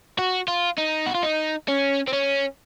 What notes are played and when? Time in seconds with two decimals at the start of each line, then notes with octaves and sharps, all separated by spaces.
0.19 F#4
0.48 F4
0.78 D#4
1.06 F#4
1.15 F4
1.23 D#4
1.68 C#4
2.08 C4
2.13 C#4